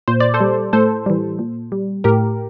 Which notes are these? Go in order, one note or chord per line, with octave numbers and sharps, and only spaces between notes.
A#2 C5
D5
A4 C5
G3
A2 A4 C5
E3 G3
A#2
G3
A2 G4 A#4